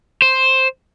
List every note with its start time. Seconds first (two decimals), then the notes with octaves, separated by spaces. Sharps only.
0.22 C5